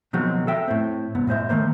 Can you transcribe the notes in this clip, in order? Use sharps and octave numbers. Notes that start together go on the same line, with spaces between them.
B2 D#3 F3 F#3 G#3 C4
A4 E5 G5
A2 C4
C2 G2 B3
A2 G#3 C5 E5
D#3 A3 A#3 C5